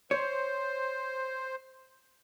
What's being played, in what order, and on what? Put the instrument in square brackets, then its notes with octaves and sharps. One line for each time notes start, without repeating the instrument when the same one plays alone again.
[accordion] C5 [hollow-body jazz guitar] C#5